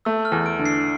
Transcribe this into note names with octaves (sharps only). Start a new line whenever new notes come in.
A3 E6
F6
E2
D7
D3
C7